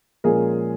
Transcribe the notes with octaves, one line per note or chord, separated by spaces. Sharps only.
A#2 F3 G#3 C#4 G#4 A#4